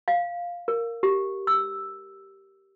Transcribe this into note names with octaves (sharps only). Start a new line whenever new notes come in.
F5
A#4
G4
E6